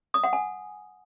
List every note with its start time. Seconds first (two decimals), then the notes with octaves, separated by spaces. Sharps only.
0.14 D#6
0.24 F#5
0.33 G#5